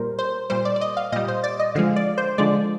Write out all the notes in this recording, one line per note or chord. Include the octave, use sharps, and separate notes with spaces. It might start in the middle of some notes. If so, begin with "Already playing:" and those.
Already playing: A#2 G3 A#4 C5
C5
A#2 G3 C5
D5
D5
D#5
F5
A#2 G3 D#5
C5
D5
D#5
D3 F3 G#3 F5
D5
C5
D3 F3 G#3 D5